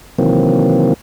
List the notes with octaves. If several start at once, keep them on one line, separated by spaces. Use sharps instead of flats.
C3 D#3 E3 F#3 A#3 C4